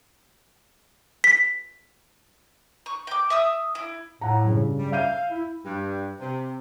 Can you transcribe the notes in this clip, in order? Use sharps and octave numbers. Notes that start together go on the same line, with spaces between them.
B6
C#6
G5 D6
E5 D#6 E6
E4
A2 F#5 A#5
G2 C#3
G3
E5 F5 G6 D#7
E4
G2
C3